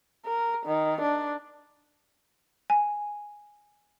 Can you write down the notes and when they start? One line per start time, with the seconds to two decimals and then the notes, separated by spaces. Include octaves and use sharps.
0.26 A#4
0.66 D#3
1.01 D4
2.70 G#5